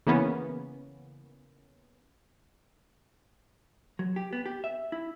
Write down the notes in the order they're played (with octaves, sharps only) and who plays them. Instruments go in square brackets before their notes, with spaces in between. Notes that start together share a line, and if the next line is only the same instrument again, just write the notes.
[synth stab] C#3 E3 A#3 B3 C#4
[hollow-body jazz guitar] F#3
G4
B3
G4
E5
E4